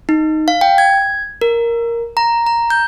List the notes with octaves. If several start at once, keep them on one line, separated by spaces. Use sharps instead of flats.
D#4
F5
G5
G#6
A#4
A#5
A#5
G6